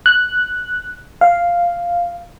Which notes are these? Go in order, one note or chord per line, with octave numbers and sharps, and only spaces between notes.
F#6
F5